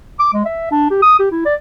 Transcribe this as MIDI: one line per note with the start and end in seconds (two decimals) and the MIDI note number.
0.20 0.29 86
0.34 0.44 56
0.45 0.71 76
0.72 0.86 62
0.90 1.01 67
1.02 1.17 87
1.19 1.28 67
1.31 1.42 64
1.46 1.55 74